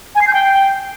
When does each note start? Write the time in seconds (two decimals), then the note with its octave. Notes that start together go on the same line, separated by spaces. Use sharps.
0.15 G#5
0.21 C7
0.27 G6
0.33 G5